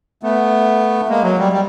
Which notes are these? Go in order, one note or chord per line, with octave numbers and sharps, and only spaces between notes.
A3 B3
G#3 A#3
F#3
G3
G3